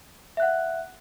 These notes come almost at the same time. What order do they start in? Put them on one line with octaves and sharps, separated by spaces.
E5 F#6 F#5